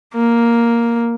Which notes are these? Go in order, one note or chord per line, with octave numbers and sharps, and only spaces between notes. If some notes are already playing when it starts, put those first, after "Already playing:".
A#3